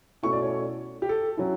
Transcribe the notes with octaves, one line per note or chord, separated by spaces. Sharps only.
B2 A3 C#4 E4 C#6
D5
C#5
G4
A4
F#3 C#4 E4